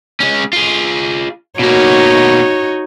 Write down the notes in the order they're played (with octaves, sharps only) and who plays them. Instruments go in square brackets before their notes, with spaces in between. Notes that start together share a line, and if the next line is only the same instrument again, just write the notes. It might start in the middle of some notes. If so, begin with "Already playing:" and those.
[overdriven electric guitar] G#3 C#4
F4 G#4
[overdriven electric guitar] B2 A#3 [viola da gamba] D#4 F#4 C#5